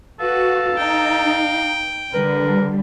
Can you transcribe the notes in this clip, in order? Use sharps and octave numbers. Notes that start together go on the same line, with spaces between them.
F#4 A4 B4 F5
D#4 G5
D3 G3 A#4 B4